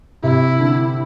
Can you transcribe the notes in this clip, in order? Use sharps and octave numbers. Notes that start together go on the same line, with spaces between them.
C3 E4
D3